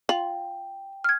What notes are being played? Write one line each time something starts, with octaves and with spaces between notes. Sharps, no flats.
F4 G5 F#7
F6 G#6